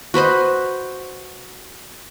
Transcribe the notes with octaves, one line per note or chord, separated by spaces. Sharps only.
F#4 B4 C5 D#5